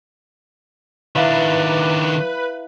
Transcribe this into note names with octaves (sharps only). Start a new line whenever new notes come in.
D#3 D4 E4 B4 E5 F5